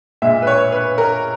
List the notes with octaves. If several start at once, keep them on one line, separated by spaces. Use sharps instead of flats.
A#2 G#3 E5
B4
C#5
B4
A#4